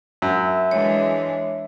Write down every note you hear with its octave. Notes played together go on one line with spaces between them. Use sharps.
F#2 E5
E3 G#3 D4 C#5